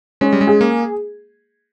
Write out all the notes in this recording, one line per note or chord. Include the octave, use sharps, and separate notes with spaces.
G#3 C#4
G3
G#3
G#4
A#3